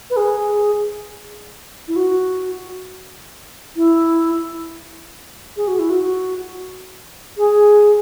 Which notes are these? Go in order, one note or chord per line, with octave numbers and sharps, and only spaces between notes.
B4
G#4
E4
F#4
E4
G#4
F#4
E4
F#4
G#4